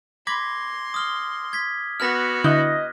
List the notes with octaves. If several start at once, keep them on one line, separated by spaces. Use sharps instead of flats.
B5 C6 D6 G#6 A#6
D#6 F6 G7
G#6 B6
B3 F#4 F6 A#6
D3 E4 D#5 F#6 G6